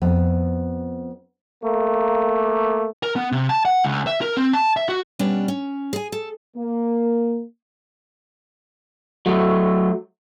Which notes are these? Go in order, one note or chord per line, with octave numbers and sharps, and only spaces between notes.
F2 B3 E5
A3 A#3
A#4
B3
C3
A5
F#5
C#2
E5
A#4
C4
A5
E5
F#4
B2 G3 B3 C#4 D4
C#4
G#4 G#5
A4
A#3
F#3 A3